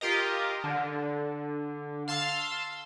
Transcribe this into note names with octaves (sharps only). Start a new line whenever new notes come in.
F4 G4 A#4 D#5
D3
F5 A5 C6 E6